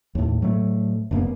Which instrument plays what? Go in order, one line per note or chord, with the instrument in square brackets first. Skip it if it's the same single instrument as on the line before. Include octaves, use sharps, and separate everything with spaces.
[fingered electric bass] D#2 A2
A2 F#3 G#3 A3
F1 F#2 A#3 B3